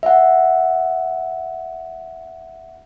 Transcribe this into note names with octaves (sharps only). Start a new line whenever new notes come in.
E5 F#5